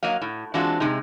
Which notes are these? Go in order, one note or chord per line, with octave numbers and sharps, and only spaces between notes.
F#3 A#3 D#5 F5
A2
E3 G#3 C4 D4 F4 F#4
C3 G#3 D#4